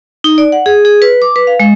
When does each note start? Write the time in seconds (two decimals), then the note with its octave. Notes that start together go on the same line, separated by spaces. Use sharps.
0.24 D#4
0.38 D5
0.52 F#5
0.66 G#4
0.85 G#4
1.02 B4
1.22 D6
1.36 B4
1.47 F5
1.60 G#3